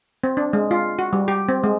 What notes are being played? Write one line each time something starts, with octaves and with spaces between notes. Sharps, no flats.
C4
D4
G#3
F4
F#4
G3
G4
C4
G#3